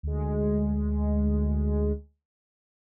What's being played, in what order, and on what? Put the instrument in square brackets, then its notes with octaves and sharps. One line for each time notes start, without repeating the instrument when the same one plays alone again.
[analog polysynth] D2 G#3